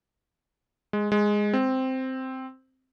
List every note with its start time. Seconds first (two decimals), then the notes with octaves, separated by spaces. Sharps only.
0.93 G#3
1.12 G#3
1.53 C4